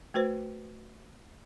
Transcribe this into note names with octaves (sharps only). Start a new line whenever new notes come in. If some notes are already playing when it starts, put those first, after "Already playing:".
A3 F#4 B4 C5